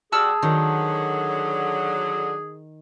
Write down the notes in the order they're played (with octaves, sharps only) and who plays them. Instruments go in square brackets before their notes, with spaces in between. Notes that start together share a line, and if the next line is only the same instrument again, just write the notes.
[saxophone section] G3 F#4 [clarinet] G#4 [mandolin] A5 E6 F6
[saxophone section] D3 F#3 [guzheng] D#3